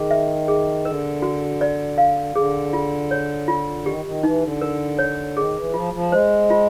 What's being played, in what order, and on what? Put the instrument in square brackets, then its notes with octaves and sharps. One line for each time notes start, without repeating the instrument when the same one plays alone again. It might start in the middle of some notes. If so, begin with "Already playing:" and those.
Already playing: [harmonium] D#3 [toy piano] G#4
[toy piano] E5
G#4
[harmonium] D3 [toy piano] A#4
[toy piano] F#4
D5
F5
[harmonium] D3 [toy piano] G#4
[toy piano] F4
C#5
F4
[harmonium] D#3 [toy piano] G4
[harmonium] D#3
[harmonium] E3 [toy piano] D#4
[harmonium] D3
[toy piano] A#4
C#5
[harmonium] D#3 [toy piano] G#4
[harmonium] E3
[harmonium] F3 [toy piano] F4
[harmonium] F3
[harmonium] G#3 [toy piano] C5
[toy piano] F4